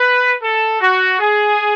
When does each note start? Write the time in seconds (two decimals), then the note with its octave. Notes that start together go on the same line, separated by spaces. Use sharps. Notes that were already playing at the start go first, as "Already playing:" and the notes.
Already playing: B4
0.42 A4
0.81 F#4
1.19 G#4